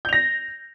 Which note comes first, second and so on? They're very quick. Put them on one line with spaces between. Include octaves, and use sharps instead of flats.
G6 F7 A#6